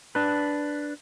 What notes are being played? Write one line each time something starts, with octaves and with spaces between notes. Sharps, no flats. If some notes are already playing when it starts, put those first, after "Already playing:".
D4 B4